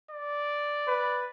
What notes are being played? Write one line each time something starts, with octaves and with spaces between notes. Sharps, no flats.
D5
B4